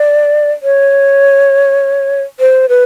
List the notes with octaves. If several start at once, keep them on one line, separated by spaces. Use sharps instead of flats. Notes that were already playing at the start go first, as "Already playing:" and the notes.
Already playing: D5
C#5
C5
B4